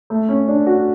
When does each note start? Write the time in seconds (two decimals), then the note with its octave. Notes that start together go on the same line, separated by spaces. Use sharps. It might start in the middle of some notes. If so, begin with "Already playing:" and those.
0.10 A3
0.29 C#4
0.48 D4
0.67 F#4